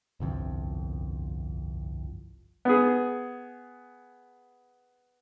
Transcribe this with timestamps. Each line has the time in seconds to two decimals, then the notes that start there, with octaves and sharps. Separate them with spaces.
0.20 G1 C2 F2
2.65 B3 G#4